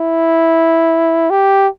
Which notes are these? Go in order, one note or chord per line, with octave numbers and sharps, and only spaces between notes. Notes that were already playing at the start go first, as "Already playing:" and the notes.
Already playing: E4
G4